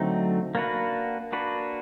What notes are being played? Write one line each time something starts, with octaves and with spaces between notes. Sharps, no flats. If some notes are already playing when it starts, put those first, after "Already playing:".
Already playing: D3 F#3 A3 C4 D#4
A#3 D4 F#4 B4
A#3 D4 F#4 B4